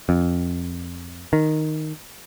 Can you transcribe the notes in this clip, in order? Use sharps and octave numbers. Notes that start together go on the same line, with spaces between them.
F2
D#3